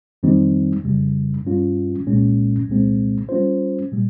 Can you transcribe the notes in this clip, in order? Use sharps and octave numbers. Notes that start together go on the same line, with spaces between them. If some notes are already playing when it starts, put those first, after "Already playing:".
F2 D#3 G3 C4 D#4
F2 C#3 G3
G2 G3 C#4 F4
C2 A#2 G#3 C#4
C2 A#2 G#3 C4
G3 C#4 F4 C5
A#2 G3